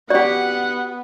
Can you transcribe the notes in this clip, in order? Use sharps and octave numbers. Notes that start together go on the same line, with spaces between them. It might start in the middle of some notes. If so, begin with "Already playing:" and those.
B3 F#4 G4 D5 F#5